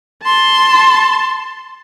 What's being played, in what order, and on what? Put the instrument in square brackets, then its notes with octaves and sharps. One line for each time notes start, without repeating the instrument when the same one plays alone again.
[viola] A5 C6